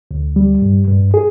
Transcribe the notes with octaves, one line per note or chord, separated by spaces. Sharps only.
D2
G3
G2
G2
G#4